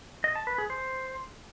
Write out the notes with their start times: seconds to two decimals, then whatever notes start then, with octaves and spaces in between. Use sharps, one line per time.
0.24 D#5
0.35 A5
0.47 B4
0.58 G#4
0.70 C5